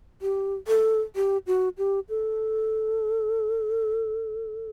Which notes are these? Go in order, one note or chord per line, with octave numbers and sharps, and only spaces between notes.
G4
A4
G4
F#4
G4
A4